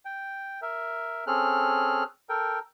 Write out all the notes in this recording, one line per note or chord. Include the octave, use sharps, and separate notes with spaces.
G5
A#4 E5
C4 C#4 G#4 A4 F6 F#6
A4 A#4 G5